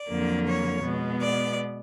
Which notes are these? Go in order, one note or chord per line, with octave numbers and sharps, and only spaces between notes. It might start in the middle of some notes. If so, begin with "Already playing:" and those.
Already playing: D5
F2 D3 F#3 A#3
C#5
B2 G#3 B3
D5